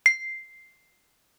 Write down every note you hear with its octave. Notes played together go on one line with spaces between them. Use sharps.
C7